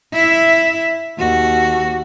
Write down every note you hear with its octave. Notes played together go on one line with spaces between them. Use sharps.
E4 E5
D#2 F#4